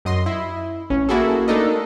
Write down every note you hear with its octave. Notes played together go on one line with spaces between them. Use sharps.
F#2 D#5 C6
E4
A1 C#4
A#3 E4 F#4 G#4 A4
A3 D4 D#4 A4 A#4 D#5